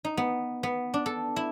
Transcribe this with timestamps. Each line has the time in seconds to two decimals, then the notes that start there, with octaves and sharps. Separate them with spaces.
0.05 D#4
0.17 B3
0.63 B3
0.94 D4
1.06 A4
1.36 E4